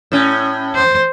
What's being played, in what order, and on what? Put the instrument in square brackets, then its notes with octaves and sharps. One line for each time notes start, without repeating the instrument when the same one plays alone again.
[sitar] A2 C#4
[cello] C5